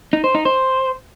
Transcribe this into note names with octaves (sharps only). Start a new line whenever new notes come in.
D#4
C5
D#4
C5